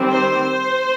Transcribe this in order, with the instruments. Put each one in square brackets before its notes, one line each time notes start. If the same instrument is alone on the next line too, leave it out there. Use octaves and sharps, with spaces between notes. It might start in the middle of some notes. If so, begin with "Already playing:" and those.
Already playing: [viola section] D#3 G3 C4
C5